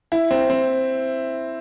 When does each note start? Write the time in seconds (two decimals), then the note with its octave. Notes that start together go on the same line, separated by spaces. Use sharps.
0.12 E4
0.31 C4
0.50 C4